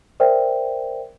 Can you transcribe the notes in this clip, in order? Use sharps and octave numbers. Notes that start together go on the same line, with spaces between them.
A#4 C5 D5 E5 G5